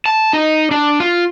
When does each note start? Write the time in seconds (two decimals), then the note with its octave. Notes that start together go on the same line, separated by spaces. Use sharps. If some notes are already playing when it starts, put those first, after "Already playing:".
0.06 A5
0.33 D#4
0.71 D4
1.00 F4